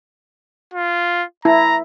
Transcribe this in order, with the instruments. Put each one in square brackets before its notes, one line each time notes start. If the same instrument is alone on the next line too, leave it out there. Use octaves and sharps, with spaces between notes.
[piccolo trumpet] F4
[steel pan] E4 [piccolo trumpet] A#5